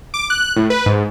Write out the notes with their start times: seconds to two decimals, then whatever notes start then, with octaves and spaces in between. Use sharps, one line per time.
0.14 D6
0.30 F#6
0.56 A2
0.70 B4
0.86 G#2